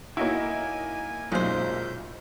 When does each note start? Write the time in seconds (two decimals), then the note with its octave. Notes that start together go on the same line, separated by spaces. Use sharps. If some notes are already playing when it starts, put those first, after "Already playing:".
0.17 A#3 D#4 E4 F#4 C#5 G#5
1.32 B1 F#2 A#2 G#3 C5 G6